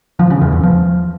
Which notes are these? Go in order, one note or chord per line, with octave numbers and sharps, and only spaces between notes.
F3
C#3
E2
E2
F3